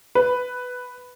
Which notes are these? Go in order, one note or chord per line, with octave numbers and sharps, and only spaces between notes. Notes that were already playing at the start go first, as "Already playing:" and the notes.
B4